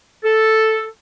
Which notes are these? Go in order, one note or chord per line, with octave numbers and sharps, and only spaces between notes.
A4